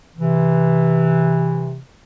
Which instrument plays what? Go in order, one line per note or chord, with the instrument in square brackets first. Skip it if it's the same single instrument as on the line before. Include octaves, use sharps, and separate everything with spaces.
[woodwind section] C3 E3